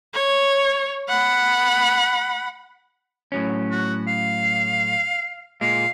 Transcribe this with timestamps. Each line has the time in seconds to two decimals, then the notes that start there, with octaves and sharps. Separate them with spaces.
0.14 C#5
1.09 F#5 B5
3.32 A2 F#3 C#4
3.71 F#4
4.08 F5
5.61 A#2 G#3 F5